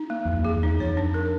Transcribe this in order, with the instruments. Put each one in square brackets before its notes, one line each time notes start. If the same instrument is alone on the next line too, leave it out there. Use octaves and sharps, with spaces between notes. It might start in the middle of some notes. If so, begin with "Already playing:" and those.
Already playing: [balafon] D#4
A#3
[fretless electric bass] E2
[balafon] A#3
[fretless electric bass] F2
[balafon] G#4
[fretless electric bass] E2
[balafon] D#4
[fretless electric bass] F2 [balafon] C#5
[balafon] D4
A#4